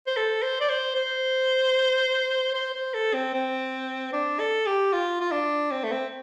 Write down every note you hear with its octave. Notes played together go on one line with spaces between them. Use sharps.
C5
A4
C5
D5
C5
C5
C5
C5
A4
C4
C4
D4
A4
G4
F4
F4
D4
C4
A3
C4